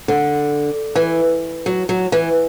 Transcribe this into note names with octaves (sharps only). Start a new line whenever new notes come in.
D3
E3
F#3
F#3
E3